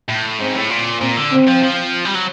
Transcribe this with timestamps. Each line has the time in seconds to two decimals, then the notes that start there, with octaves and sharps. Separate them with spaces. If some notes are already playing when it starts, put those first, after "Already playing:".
0.08 A2
0.39 G#2 C4
0.55 A2
0.70 A#2
1.01 A#2 C4
1.17 D3
1.32 C4
1.48 F3
1.63 F3
2.05 G3
2.15 F#3